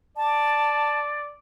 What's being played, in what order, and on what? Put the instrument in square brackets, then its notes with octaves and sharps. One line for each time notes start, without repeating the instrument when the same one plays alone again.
[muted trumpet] D5 [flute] A5